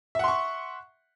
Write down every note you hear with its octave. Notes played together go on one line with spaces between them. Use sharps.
E5 F#5 C6 C#6